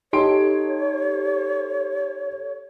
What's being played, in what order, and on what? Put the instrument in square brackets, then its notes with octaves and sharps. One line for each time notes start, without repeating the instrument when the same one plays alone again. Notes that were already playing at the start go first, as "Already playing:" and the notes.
[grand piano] D#4 C6 D7 [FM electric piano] G4 A4 [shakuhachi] C#5